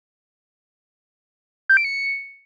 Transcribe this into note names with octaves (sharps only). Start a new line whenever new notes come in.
G6
D7
C#7